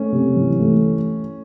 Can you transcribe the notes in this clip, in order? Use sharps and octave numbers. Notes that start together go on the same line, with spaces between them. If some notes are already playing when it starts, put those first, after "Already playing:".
Already playing: A3 C#4
C3
E3
A3